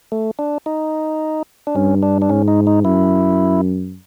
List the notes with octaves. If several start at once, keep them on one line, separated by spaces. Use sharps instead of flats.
A3
D4
D#4
D4
G2 C#4
D4
D4
G#2 C#4
D#4
D#4
F#2 E4